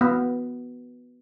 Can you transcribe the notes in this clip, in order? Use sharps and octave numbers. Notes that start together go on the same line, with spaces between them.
B3